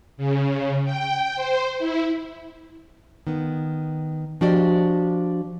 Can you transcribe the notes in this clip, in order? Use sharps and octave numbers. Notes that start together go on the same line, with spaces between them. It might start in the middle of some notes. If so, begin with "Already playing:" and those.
C#3
G5
C5
E4
D#3 B3
F3 D4 F#4 G4 D5 D#5